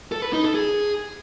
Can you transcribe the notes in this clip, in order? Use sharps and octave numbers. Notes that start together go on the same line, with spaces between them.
A4
B4
D#4
A4
G#4